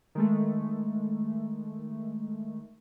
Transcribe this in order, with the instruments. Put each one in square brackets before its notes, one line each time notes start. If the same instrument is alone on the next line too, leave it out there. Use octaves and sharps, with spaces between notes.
[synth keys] D#3 G#3 A3